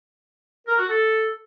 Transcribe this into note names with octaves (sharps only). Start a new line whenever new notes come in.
A#4
F#4
A4